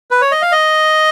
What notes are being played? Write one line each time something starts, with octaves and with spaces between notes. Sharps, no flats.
B4
C#5
D#5
F5
D#5